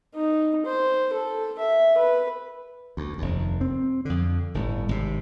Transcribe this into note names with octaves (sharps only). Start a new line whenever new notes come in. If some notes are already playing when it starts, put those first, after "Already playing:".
D#4
C5
A4
E5
B4
D2
F1 D#2
C4
F2 D3
G1 A2
G#1 C3